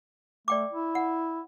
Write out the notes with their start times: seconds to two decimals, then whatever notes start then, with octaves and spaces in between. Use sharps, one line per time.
0.48 A3 D5 G5 D6
0.73 E4
0.95 F#5